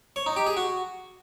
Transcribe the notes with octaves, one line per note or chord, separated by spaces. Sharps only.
C#5
D#4
G4
G#4
F#4